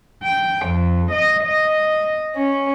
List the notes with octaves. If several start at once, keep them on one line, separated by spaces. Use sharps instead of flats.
G5
F2
D#5
D#5
C#4